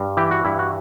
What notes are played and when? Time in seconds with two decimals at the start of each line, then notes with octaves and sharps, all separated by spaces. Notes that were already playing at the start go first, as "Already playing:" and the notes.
Already playing: G2
0.17 E3 G4
0.31 F#4
0.45 G2 E4
0.59 F#4